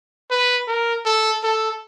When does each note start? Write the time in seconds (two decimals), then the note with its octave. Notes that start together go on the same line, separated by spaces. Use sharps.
0.31 B4
0.68 A#4
1.05 A4
1.43 A4